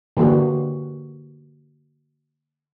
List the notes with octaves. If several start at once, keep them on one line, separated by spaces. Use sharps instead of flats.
D3 E3 A#3 F#4 G4